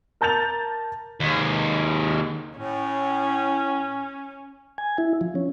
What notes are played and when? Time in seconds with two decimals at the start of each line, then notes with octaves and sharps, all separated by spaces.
0.21 A#4 A5 G6 A6 F7
1.20 D#2 G#3
2.58 A2 C#4
4.78 G#5
4.98 E4
5.21 F3
5.35 C#4